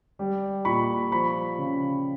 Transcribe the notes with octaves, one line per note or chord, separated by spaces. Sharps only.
G3
A#2 B5 C#6
F3 B5 C#6
C#3